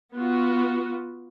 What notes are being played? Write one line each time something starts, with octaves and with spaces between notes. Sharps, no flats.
B3 F4 F#4